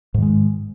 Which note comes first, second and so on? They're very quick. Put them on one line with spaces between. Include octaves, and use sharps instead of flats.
G#2 D#3 G#3